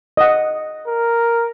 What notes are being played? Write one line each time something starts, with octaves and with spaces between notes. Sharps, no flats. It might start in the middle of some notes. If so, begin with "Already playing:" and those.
D#5 F#5
A#4